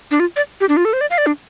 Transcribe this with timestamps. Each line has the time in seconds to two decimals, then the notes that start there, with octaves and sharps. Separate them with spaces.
0.11 D4
0.20 F4
0.36 D5
0.61 G4
0.69 D4
0.77 F4
0.85 A4
0.93 C5
1.01 D5
1.10 F5
1.18 D5
1.26 D4